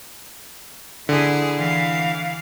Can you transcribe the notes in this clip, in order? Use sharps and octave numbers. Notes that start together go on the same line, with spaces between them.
D3 E4 G#4
E3 F5